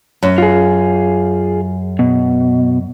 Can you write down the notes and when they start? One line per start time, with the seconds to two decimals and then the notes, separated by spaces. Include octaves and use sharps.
0.23 F#2
0.38 F4 G#4
1.99 B2